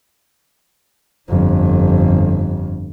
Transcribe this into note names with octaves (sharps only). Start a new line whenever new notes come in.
G1 F2